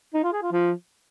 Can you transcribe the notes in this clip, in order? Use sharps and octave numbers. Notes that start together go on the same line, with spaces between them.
D#4
F4
G#4
F4
F3